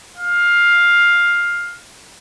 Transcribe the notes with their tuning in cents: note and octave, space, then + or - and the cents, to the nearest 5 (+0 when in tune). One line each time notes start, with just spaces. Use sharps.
F5 +10